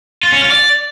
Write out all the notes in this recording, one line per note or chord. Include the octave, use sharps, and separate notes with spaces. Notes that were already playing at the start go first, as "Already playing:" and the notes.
F4
C#4
F4
D5